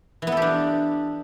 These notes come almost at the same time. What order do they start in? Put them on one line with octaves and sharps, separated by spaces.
E3 B3 A4 G4 D4